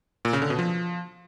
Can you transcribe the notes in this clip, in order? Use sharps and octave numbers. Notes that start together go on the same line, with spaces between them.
A#2
C#3
D3
B2
F3